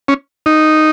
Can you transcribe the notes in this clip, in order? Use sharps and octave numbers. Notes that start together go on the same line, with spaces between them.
C#4
D#4